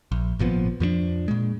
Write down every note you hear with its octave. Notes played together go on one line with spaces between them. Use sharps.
A#1
G#1 A#2 F3 B3
F2 F3 A3 D4
A#2 G#3